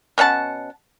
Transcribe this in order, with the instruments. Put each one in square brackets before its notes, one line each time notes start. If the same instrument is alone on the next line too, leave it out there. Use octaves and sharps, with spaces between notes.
[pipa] B2 C#4 F#5 A5